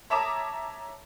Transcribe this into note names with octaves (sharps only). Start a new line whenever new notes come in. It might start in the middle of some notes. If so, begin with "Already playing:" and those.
C#5 E5 A5 A#5 D6 D#6